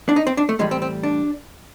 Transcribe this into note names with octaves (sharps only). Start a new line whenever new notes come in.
D4
D#4
C4
D4
A3
A2 E3 G3 G#3
C4
C4
D4